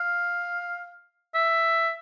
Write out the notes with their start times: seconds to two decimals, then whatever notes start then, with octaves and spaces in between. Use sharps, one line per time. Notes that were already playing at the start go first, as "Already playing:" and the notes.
Already playing: F5
1.35 E5